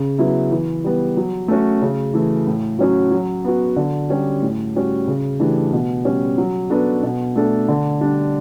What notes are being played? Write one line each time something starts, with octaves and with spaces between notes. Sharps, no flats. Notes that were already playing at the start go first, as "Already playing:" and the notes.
Already playing: C#3
F#3 B3 E4
E3
G3 B3
F#3
A3 C#4 F#4
C#3
E3 A3
A2
F#3 C#4 F#4
F#3
B3 F#4
D3
G3 C#4 G4
A2
G3 C#4 F#4
C#3
E3 A3 D4 G4
B2
G3 C#4
F#3
B3 D4 F#4 A4
B2
A3 D4 A4
D3
G3 D4